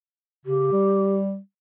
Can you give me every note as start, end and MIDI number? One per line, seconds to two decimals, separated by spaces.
0.46 0.72 49
0.46 1.14 67
0.72 1.38 55